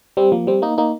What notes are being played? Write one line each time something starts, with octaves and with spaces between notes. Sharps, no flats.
G3 C4
F3 A#3
G3 C4
A#3 D#4
A#3 D#4